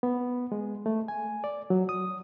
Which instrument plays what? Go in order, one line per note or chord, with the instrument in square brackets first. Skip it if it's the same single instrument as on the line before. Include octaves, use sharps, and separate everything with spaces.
[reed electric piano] B3
G#3
A3
G#5
D5
F#3
D#6